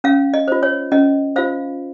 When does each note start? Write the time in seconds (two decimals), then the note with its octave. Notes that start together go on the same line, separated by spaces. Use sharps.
0.04 C#4 F5
0.34 D#5
0.48 F4 C5
0.63 C#5
0.92 C#4 D#5
1.36 F4 C5 F5